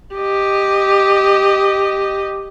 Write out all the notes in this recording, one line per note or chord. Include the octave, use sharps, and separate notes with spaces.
G4 D#5